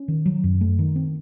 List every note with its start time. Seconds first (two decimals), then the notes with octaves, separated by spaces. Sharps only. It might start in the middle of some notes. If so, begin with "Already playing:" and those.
Already playing: C#4
0.08 D#3
0.26 F#3
0.44 F#2
0.61 A3
0.79 D#3
0.96 C4